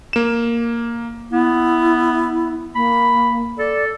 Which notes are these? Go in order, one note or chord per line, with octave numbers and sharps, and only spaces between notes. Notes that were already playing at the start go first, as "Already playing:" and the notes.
A#3 E7
B3 E4
A#3 B5
A4 D5